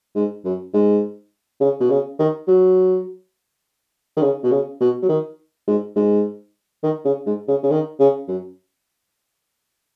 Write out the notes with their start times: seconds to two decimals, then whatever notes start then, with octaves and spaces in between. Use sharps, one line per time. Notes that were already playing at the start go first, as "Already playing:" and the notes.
0.15 G#2
0.44 F#2
0.74 G#2
1.60 C#3
1.80 B2
1.90 C#3
2.19 D#3
2.47 F#3
4.16 D#3
4.22 C#3
4.43 B2
4.51 C#3
4.80 B2
5.02 F#3
5.09 D#3
5.67 G#2
5.96 G#2
6.83 D#3
7.05 C#3
7.26 G#2
7.48 C#3
7.63 C#3
7.70 D#3
8.00 C#3
8.28 F#2